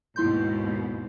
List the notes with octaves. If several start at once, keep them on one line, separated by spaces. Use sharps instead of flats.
D#2 G#2 B2 E4 C6 G6